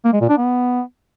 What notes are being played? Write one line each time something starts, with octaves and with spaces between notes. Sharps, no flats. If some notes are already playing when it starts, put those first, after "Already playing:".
A#3
G#3
A#2
D4
B3